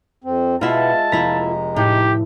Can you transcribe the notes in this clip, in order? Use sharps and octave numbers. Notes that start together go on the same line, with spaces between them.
F2 C4
B2 G#3 E4 F4 E5 F#5 A5
F1 A#3 E4 F4 A#5 B6
A2 D#4 G4